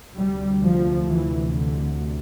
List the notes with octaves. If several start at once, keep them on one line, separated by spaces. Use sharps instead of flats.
D2 C3 G3
F3
E3
D3